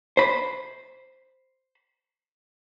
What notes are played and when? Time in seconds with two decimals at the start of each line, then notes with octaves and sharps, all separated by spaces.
0.17 C5 B5